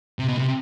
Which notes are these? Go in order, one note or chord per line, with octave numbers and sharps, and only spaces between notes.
C3
B2
C3